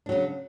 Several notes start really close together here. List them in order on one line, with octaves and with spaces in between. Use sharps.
D4 F#3 C#3